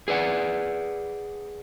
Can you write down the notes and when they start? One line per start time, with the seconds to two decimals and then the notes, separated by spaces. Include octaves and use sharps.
0.08 G#4 B4 D5 F#5